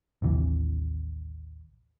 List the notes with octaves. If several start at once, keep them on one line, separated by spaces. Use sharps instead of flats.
A1 D#2 C3 E3